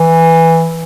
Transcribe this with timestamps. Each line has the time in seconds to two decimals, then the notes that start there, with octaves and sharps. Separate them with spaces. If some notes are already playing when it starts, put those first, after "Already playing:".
Already playing: E3